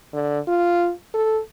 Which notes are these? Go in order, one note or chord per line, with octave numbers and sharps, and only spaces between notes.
D3
F4
A4